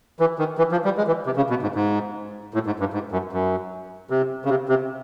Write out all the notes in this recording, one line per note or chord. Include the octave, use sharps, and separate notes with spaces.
E3
D#3
E3
F3
G3
G#3
E3
C3
C#3
B2
G#2
G#2
A2
G#2
G2
G#2
F#2
F#2
C3
C#3
C3
C3